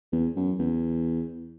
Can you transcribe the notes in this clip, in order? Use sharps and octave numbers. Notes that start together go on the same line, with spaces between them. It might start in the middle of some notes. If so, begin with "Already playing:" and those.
E2
F#2
E2